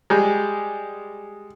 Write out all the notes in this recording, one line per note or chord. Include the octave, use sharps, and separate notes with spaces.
G3 G#3